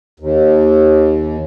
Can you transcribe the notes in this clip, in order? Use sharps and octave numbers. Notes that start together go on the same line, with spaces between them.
D#2